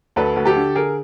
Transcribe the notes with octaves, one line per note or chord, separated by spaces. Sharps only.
D2 A4 B4
D2
G4 A4
D3
D3 G#4 A#4